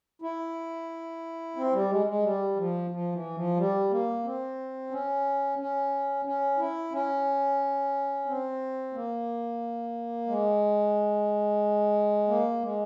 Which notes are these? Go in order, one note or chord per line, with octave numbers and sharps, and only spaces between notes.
E4
C4
G3
G#3
G#3
G3
F3
F3
E3
F3
G3
A#3
C4
C#4
C#4
C#4
E4
C#4
C4
A#3
G#3
A#3
G#3